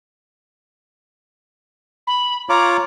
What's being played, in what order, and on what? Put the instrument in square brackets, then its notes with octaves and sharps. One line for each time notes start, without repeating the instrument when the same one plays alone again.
[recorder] B5
[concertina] F4 C#5 D6 [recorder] A#5